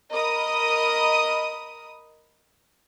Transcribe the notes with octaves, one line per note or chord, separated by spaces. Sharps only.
A#4 D#5 B5 D#6